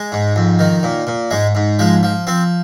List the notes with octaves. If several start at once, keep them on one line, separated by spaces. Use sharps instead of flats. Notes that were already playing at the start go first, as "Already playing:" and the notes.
Already playing: G#3
G#2
F2
D#3
A#2
A#2
G#2 G#3
G#2
F3 G#3
F3
F3 C4